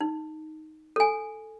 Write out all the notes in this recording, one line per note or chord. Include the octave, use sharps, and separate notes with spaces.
D#4
A4 G#5